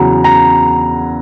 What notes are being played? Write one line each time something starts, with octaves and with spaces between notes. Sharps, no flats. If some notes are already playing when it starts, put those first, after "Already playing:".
Already playing: E2 C#3 F#3 A#5
A#5